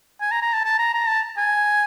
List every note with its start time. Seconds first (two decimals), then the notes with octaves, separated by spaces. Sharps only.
0.21 G#5
0.31 A#5
0.42 A#5
0.53 A5
0.64 A5
0.79 A#5
0.94 A#5
1.08 A5
1.38 G#5